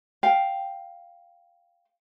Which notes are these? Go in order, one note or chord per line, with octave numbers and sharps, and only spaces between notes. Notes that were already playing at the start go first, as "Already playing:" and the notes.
F5 G5